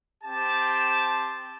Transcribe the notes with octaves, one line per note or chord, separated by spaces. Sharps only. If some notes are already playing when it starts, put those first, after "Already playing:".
C4 G4 A5